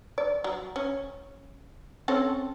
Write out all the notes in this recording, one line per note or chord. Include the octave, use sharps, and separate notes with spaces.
D5
F#3
C#4
C4 C#4 A4